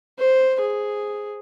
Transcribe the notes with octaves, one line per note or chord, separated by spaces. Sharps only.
C5
G#4